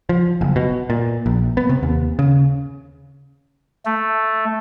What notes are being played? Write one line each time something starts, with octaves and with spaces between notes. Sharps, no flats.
F3
F#1
B2
A#2
A#1
B3
C3
D#2
C#3
A3